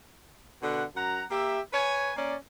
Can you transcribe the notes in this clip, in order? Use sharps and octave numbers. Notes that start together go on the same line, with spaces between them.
B2 D3 F#5
F#2 F#5 A#5
A#3 G4 E5
B4 C#5 G#5
A#3 C#4 D5